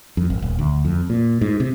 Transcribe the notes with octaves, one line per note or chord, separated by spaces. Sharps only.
F2
G#1
D#1
D2
F2
A#2
G#2
C3